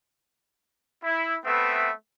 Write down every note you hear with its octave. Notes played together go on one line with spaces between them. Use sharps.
E4
A3 B3 C4 B4 E5